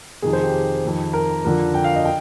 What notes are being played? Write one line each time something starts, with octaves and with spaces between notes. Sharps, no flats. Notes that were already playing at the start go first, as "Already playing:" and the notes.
F2 C3 D#3 G#4
C5
G4
F2 D#3
A#4
F2 D3 F3 A#4
G5
F5
D#5
G5